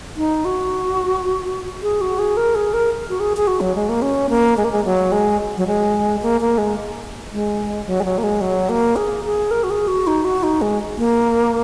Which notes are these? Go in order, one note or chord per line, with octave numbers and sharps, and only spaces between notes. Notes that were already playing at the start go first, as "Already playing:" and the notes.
D#4
F#4
G#4
F#4
G#4
A#4
G#4
A#4
F#4
G#4
G#4
F#4
F#3
G#3
A#3
C#4
A#3
G#3
A#3
G#3
F#3
G#3
F#3
G#3
A#3
A#3
G#3
G#3
F#3
G#3
F#3
A#3
G#3
F#3
A#3
G#4
G#4
A#4
F#4
G#4
F#4
D#4
F#4
D#4
G#3
A#3